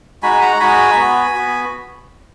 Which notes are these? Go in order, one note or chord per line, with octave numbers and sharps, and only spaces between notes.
G#3 D#4 F#4 G#5 B5
F#5 A#5
G#3 D#4 F#4 G#5 B5
B3 F#4
B3 F#4